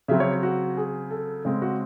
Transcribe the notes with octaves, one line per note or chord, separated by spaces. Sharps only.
C#3 F#3 C4 E5
C#5
F#4
G#4
A4
C#3 G#3 C4
F#4